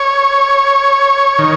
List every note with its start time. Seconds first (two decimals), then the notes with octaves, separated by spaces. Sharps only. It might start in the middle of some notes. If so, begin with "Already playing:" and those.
Already playing: C#5
1.39 D#3